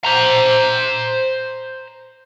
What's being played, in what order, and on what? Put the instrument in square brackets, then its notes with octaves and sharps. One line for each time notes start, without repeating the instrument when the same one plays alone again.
[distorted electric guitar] C5 A#5